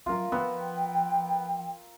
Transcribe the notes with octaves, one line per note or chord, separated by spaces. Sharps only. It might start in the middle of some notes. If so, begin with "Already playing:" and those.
F#3 C#4 F4 A#4
F3 B3 G5 E6